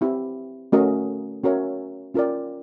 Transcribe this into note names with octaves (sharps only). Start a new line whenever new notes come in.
C4 E4 G4
A3 C#4 F#4 A#4 D#5
C#4 F#4 A#4 C#5 E5
C#4 F4 A#4 D5 G5